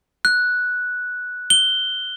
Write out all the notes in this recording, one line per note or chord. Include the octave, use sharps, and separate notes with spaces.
F#6
G7